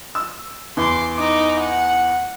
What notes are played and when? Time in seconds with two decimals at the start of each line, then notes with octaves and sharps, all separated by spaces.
0.15 E6
0.77 E2 C6 D6
1.16 D#4 D6
1.60 F#5